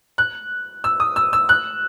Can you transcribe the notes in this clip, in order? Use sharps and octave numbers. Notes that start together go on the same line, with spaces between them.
F#6
E6
D#6
E6
E6
F#6